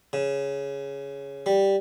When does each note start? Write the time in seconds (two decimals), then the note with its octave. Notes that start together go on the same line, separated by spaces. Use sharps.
0.13 C#3
1.46 G3